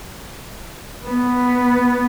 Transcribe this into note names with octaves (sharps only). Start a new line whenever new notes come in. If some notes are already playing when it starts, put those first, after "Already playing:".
B3